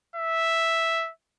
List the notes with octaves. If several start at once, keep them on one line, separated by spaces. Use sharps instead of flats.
E5